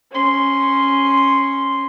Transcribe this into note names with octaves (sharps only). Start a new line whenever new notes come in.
C#4 C6